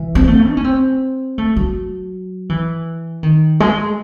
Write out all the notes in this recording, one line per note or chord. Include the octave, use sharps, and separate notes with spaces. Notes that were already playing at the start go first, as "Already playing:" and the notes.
Already playing: E3
C4
A3
D#4
C#4
C4
A3
F#3
E3
D#3
G#3